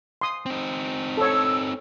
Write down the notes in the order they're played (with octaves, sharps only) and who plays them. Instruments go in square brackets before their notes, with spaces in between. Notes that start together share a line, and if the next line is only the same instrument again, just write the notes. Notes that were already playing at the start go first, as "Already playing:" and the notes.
[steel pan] C6 D#6
[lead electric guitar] C4 D#4
[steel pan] A4 C#5 [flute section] E6